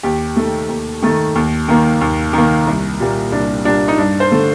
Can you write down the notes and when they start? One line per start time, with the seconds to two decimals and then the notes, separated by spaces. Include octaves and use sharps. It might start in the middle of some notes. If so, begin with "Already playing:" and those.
0.03 D#2 G4
0.36 D#3 A3
0.69 D#2
1.02 D#3 A3
1.35 D#2
1.68 D#3 A#3
2.01 D#2
2.33 D#3 A#3
2.67 C2
3.00 A#2 G3 A#3
3.32 C2 D4
3.65 A#2 G3 A#3 D4
3.88 D#4
3.98 G2 D4
4.20 C5
4.31 D3 A3